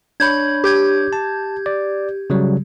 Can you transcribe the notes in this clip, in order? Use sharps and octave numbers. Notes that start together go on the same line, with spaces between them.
D4 C#5 B5 G6 G#6
G4 G6 G#6
A5
D5
C#3 F#3 G3